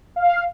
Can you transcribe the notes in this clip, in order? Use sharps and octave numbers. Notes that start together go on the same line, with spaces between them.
F5